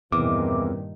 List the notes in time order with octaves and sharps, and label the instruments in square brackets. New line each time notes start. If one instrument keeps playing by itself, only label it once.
[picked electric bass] E2 [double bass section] G2 A#2 D#3 [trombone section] E3 A#3 C4 [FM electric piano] D6